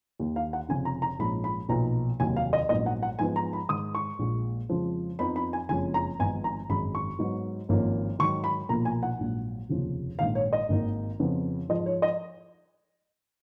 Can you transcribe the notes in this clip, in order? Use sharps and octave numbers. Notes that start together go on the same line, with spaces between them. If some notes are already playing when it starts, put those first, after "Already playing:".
D#2 D#3 A#3
F5
F#5
F1 F2 C#3 G#5
A#5
A#5
A#1 G#2 F3 G#3 C#4 B5
B5
B1 A#2 F3 B3 D#4 A#5
F1 D#2 D#3 F#3 G#5
F5
D#5
A#1 G#2 F#3 B3 D#4 D#5
F#5
F#5
G#2 F3 G#3 B3 G#5
A#5
B5
G#2 D#3 G#3 D#6
C#6
A#1 A#2 G#3
F2 C#3 F3 G#3
F2 F3 B3 D#4 B5
B5
G#5
F#1 F2 F3 G#3 C#4 G#5
A#5
G#1 G#2 F3 B3 D#4 G#5
A#5
G#1 F#2 D#3 G#3 B5
C#6
G#2 F#3 B3 D#4
G#1 G#2 F3 A#3 C#4
G#2 D#3 F#3 C#6
B5
B1 A#2 F3 A#3 A#5
G#5
F#5
A#1 G#2 F#3
F1 D#2 C#3 F3
A#1 G#2 D#3 F5
C#5
D#5
G#1 G#2 D#3 A#3 D#4
F2 C#3 F3 B3
G#2 F3 G#3 D#5
C#5
D#5